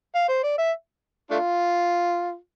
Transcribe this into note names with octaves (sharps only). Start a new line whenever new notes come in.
F5
C5
D5
E5
A3 D4 F4